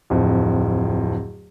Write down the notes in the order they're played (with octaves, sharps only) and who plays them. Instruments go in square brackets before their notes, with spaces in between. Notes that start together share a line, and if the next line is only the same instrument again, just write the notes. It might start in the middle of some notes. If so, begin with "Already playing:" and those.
[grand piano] D1 F2